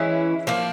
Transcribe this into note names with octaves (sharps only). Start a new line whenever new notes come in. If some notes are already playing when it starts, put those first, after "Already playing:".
Already playing: E3 G#3 C#4 E4
F3 A#3 D4